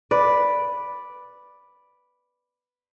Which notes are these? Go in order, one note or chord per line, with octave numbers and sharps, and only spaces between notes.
B4 D5